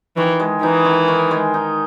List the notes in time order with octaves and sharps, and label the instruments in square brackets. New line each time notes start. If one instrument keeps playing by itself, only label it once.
[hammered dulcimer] D#3 [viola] E3
[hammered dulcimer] G#3
[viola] E3 [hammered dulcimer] D#4
[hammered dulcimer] D#3
D#3
G#3
D#4